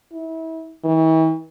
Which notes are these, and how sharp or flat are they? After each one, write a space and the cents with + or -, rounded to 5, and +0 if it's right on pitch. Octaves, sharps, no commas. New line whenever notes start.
E4 -30
E3 -45